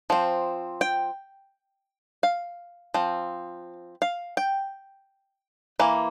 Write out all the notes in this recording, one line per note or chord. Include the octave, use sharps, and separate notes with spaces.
F3 C4
G5
F5
F3 C4
F5
G5
E3 A#3